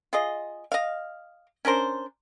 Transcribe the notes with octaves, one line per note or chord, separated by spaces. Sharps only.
F4 G#4 D#5
D#5 F5
C#4 D4 A#4 C5